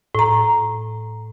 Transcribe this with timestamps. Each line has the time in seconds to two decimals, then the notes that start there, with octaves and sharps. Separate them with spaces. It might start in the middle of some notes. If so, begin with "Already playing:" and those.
0.15 A2 A#5